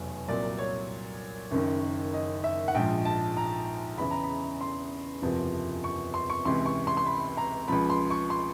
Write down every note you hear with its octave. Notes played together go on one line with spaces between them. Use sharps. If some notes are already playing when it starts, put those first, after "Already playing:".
Already playing: F1 E2 B2 F#3 G#5
C2 A#2 F#3 D5
C#5
F#1 F#2 D#3
D#5
E5
F#5
A#1 G#2 F3 G5
A5
A#5
E2 C#3 E3 B5
A#5
B5
C6
F#1 E2 C3 F3
C#6
C6
C#6
C#2 C3 E3 C6
C#6
C6
C6
B5
A#5
C#2 C#3 F3 B5
C6
C#6
C6